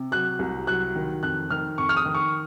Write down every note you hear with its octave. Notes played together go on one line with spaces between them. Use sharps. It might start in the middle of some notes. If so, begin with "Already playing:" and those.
Already playing: C3
F#3 F#6
C2
F#3 F#6
D#3
F2 F#6
D#3 F6
F2 C#6
F6
D#6
D#3
C#6